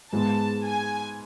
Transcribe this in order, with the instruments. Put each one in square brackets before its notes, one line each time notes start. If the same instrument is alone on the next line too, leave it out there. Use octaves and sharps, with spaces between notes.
[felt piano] G#2 G#3 B3 [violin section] A5
[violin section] G#5